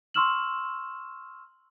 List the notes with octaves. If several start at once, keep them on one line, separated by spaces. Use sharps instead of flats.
C6 C#6 E6 F6 E7 F#7